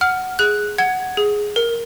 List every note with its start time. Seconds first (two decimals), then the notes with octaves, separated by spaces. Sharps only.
0.01 F#5 F6
0.39 G#4 F#6
0.78 F#5 G#6
1.17 G#4
1.56 A#4